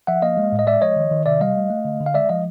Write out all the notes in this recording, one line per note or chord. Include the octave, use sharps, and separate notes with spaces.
F3 E5 F#5
A#3 D#5 F5
G#3
A2
D#5
G#3 D5 E5
F3 C#5 D#5
D#3
D#3
C3 D5 E5
G3 D#5 F5
A3
A3
D3
D3
F5
G#3 D5 E5
F3 D#5 F5